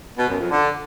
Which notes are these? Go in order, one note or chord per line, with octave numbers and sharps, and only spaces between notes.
B2
F#2
F2
D3